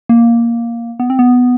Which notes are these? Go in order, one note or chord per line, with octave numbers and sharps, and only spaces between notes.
A#3
B3
C4
B3